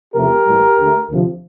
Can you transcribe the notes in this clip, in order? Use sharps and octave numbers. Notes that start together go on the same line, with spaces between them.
E2 C3 F3 A3 G4 A#4
A1 A2 E3 G3
D2 D3 A3
D2 C3 F3